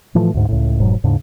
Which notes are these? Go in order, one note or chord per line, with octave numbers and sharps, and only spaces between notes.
A2 E3 F3 A3
D2 G#2
C#2 A2
F1 G#2 B2 F#3
D#2 G#2 C#3 D4